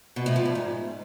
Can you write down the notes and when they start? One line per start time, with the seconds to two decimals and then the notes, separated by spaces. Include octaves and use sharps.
0.16 B2
0.26 A2
0.36 F3
0.45 G2
0.55 G#2